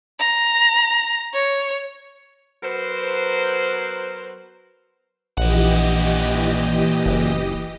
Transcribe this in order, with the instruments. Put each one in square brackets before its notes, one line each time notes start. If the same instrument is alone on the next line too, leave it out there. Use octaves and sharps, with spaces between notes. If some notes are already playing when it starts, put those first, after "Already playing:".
[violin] A#5
C#5
[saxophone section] F#3 B3 A#4 C5
[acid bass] A#1 [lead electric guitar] A#2 F#5 [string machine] E3 G4 D#5
[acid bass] F#1